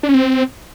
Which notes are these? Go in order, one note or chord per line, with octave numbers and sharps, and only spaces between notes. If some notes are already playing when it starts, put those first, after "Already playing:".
D4
C#4
C4